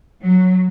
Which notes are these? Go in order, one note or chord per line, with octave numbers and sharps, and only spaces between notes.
F#3